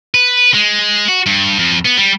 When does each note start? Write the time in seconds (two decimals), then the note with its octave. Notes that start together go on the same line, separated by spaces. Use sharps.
0.14 B4
0.54 G#3
1.08 F#4
1.26 G2
1.59 F2
1.85 B3
1.97 G3